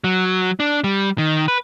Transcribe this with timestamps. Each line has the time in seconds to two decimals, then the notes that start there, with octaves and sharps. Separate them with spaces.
0.04 F#3
0.60 D4
0.84 G3
1.18 D#3
1.48 B4